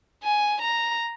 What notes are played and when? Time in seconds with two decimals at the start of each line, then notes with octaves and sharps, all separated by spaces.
0.23 G#5
0.61 A#5